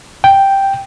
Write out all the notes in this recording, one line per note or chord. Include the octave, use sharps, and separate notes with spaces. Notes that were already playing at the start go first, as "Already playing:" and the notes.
G5